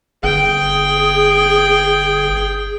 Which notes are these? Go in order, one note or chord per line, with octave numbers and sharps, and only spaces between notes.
G1 G#4 G5